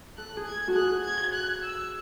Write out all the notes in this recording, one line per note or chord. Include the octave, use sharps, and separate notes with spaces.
A4 F#6
G#4
G#6
A4
F#4
G#4 F#6
G#6
F#6
E6